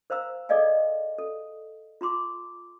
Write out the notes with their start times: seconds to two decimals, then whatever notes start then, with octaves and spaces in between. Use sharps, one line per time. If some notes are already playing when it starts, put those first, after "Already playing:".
0.10 A#4 C5 F5 A#5 E6
0.49 G#4 A4 D5 D#5 F5 G#5
1.19 A4
2.01 F4 A#5 C6 D6